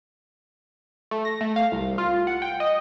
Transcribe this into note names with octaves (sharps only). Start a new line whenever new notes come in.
A3
A#6
A3
F5
C2
F4
F#5
G5
D#5